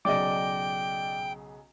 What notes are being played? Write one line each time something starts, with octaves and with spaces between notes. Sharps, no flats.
B1 C#3 F#3 D5 D#5 G5 D6